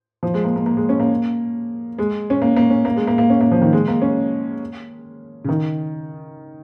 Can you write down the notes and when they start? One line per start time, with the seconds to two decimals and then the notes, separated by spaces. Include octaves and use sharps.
0.23 F3
0.34 G#3
0.44 A#3
0.56 A#3
0.66 A#3
0.77 G#3
0.89 C#4
1.00 A#3
1.98 G#3
2.30 C#4
2.42 A#3
2.57 A#3
2.70 C#4
2.85 A#3
2.96 G#3
3.07 A#3
3.18 A#3
3.30 C#4
3.41 A#3
3.51 F3
3.62 D#3
3.73 G#3
3.88 A#3
4.02 C#4
5.44 C#3
5.49 D#3